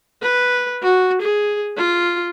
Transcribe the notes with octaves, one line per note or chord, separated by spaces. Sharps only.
B4
F#4
G#4
F4